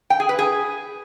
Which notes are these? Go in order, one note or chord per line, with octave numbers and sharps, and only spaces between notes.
G5
G#4
B4
G#4